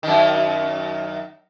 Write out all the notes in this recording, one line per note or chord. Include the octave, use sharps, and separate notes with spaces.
F#2 D#3